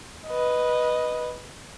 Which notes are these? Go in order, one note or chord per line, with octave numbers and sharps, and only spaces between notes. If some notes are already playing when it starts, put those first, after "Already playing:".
B4 D#5